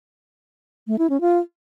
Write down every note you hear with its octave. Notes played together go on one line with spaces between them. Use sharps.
A3
E4
C#4
F4